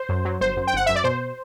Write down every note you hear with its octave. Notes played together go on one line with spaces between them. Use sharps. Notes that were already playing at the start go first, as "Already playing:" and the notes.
Already playing: C5
F#2
F#3
G1 C5
F#2
G5
G1 F#5
F#2 E5
D5
B2 C5